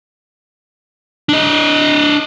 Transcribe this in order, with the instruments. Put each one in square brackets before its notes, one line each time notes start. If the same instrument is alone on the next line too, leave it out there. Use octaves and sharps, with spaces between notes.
[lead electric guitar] D4 D#5